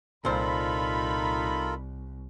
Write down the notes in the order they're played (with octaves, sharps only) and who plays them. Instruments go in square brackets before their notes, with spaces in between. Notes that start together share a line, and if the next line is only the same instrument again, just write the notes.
[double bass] C2 [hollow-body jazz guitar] A#2 C5 [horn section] D#4 B5 [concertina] F4 A4 A#4